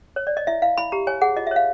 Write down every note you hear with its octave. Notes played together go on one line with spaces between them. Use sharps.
C#5
D5
D#5
E4 E5
E4 F5
E4 B5
G4 A#5
C#5 G#5
G#4 F#5
F4 D#5
E5
C#5 F5